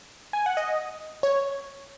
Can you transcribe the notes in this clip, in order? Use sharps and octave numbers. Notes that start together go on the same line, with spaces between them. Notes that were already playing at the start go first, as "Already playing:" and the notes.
G#5
F#5
D#5
C#5